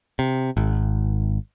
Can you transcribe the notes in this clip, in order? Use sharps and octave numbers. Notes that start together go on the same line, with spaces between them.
C3
G#1